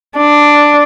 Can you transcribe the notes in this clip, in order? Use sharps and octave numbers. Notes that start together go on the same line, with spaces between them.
D4